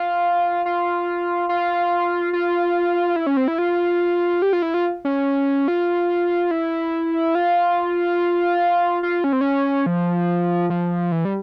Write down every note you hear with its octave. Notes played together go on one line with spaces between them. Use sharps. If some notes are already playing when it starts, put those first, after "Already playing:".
Already playing: F4
F4
F4
F4
E4
C#4
C4
E4
F4
G4
F4
E4
F4
C#4
F4
E4
F4
F4
C#4
C4
C#4
F3
F3
E3
G3